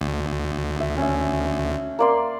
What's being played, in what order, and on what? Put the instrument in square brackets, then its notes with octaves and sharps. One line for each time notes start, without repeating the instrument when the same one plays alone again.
[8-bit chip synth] D2
[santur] E5
C#4 E5
A#3 D5 C6